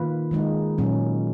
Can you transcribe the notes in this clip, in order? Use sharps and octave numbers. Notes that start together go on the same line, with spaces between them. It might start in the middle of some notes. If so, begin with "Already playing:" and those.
Already playing: D#3 A#3 F4 B4
D#3 G#3 D#4
A#2 F#3 A#3 C#4